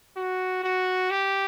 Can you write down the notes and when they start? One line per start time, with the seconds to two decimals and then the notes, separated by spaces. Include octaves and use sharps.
0.16 F#4
0.63 F#4
1.10 G4